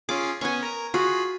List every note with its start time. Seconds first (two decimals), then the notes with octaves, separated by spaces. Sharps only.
0.09 C#4 F4 G#4 D6
0.41 B3 C#4 G#5 C#6
0.63 A#4 A#5
0.94 F4 F#4 G#4 B5